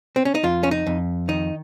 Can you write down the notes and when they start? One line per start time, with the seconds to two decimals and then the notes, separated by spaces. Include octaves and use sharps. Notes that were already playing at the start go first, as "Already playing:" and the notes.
0.16 C4
0.25 C#4
0.35 D#4
0.43 F2 F4
0.63 C#4
0.71 D#4
0.87 F2
1.28 D#3 D#4